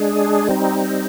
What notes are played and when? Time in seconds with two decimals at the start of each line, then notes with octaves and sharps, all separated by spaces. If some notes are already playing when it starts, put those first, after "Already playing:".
Already playing: G#3 D4 G#4
0.49 G3 C4 D#4